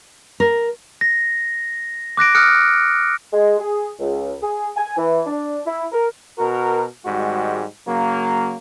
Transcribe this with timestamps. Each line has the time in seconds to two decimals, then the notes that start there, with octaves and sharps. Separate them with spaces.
0.40 A#4
1.01 A#6
2.17 D6 F#6 A#6 D7
2.35 D#6 F6 F#6 C#7
3.33 G#3
3.59 G#4
4.00 C#2
4.43 G#4
4.77 G#5
4.97 E3
5.27 D4
5.66 E4
5.92 A#4
6.39 B2 F#4 A#4
7.05 G#1 G#2 G3 G#3 F#4
7.88 C#3 F#3 A#3